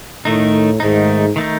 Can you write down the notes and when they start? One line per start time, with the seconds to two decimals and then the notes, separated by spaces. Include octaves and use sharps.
0.25 A2 D#3 A3 D#4
0.80 G#2 D#3 A3 D#4
1.36 D#3 A3 D#4